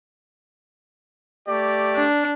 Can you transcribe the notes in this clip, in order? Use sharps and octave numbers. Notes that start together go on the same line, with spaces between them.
A3 G4 D5
D4